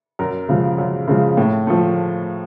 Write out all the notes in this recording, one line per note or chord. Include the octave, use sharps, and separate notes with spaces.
F#2 A#4
C#3 F3 G#3
F#2
C#3 F3 G#3
A2
F3 A3